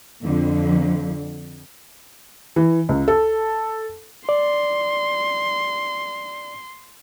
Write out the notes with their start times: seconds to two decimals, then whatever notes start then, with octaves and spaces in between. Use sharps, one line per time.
0.24 F2 D3
2.56 E3
2.89 C#2
3.08 A4
4.29 D5 C6